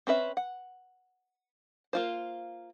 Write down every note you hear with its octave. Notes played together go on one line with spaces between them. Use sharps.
C4 C#4 B4 E5
F#5
A#3 F4 C5